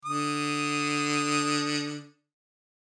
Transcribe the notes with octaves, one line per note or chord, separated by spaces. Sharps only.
D3 D#6